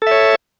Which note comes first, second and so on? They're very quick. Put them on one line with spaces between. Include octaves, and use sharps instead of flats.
A4 E5 C#5